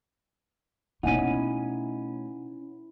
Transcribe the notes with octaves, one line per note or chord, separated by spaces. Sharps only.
B2 A3 C#4 D#4 E4 F#5 G#5 D#7